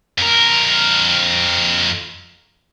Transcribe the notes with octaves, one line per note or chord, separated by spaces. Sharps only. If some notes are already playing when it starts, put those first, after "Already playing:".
F2 A#4